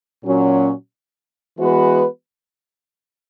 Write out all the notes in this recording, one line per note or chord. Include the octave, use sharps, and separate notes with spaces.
A#2 F#3 C#4
E3 G#3 B3 F#4 B4